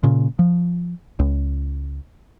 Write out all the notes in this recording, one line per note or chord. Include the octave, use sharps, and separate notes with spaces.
A#2 C#3
F3
C#2